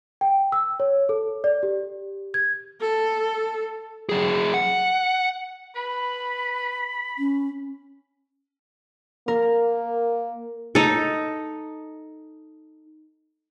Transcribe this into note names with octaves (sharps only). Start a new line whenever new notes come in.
G5
E6
C#5
A4
D5
G4
G#6
A4
F#3 G#4
F#5
B4 B5
C#4
A#3 A#4
D#4 A4